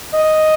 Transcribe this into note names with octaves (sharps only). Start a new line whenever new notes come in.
D#5